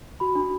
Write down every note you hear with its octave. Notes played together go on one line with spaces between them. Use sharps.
F#4 B5
D4